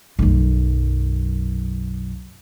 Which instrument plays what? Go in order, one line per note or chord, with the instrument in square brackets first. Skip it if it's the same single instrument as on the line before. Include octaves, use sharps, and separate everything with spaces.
[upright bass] B1 F#2